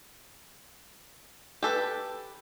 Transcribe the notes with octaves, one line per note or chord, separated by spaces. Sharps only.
G4 A4 B4